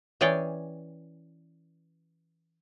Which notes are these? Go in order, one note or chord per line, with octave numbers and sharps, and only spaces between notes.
E3 C#4 G#4 C#5 D5 G5